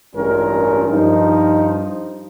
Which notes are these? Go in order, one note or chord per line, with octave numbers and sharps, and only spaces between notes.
A1 G2 G#3 C#4 F4 A#4
G2 F3 D#4